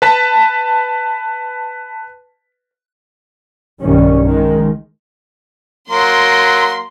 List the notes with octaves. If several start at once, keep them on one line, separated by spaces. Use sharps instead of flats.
B4 A5 B6
B1 G2 D#3 G3 C#4
D#3 G#3
F#3 A#3 C6